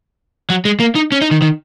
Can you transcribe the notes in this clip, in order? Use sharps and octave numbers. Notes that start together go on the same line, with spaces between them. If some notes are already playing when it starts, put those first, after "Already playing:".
F#3
G#3
A#3
D#4
C#4
D#4
D#3
D#3